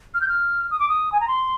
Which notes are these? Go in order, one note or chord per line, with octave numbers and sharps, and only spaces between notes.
F6
G6
F6
D#6
D6
D#6
G#5
A#5
C6